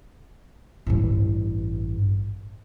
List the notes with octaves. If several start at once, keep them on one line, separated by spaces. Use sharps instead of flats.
A1 G2